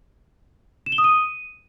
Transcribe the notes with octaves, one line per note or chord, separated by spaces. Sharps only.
E7
G7
D#6
D#7